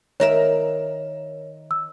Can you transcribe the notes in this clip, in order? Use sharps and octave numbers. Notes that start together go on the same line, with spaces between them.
D#3 A#4 C#5 E5
E6